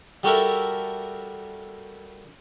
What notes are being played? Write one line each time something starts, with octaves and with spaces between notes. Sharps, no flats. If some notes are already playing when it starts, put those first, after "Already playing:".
G3 F#4 G4 A4 A#4 E5